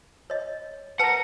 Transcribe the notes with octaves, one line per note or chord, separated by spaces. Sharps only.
C#5 D#5
A#4 B4 F#5 A5